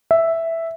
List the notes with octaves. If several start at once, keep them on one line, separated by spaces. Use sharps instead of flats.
E5